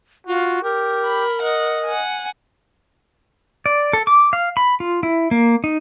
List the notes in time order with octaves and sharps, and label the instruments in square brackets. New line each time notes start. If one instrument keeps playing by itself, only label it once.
[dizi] F4 [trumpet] F#4
[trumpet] G4 [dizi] A#4
[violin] B5
[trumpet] D#5 [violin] F#5
[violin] F#5 G#5
[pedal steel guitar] D5
A4
D6
F5
B5
F4
E4
A#3
D#4